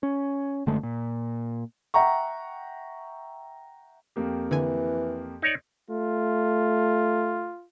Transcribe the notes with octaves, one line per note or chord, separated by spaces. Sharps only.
C#4
F#1 D3 G#3 A3
A#2
E5 F#5 G5 A#5 C#6
F2 A#3 G4
D3 E3 G#5
D#4 C#5 D5
A3 F4